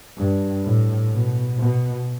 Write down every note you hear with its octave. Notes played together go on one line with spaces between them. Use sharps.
G2
A2
B2
B2